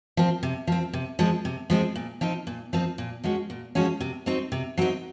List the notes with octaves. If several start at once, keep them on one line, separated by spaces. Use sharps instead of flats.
F3 C4
C3
F3 C4
C3
F3 G#3 C4
C3
F3 G#3 C4
A#2
F3 C4 D#4
A#2
F3 C4 D#4
A#2
F3 G#3 C#4 F#4
A#2
F3 G#3 C#4 F#4
C3
F#3 C4 D#4
C3
F#3 C4 D#4